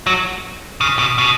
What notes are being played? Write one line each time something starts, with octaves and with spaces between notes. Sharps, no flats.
F#3
C#3
B2
B2